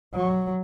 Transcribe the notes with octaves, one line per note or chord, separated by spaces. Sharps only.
F#3